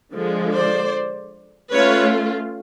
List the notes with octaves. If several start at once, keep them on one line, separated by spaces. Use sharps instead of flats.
D3 F3 G#3
C5 D5
A3 C#4 F4 B4 C#5